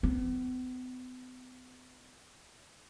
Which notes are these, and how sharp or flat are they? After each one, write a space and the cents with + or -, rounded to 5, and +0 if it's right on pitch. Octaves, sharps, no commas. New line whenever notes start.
B3 +45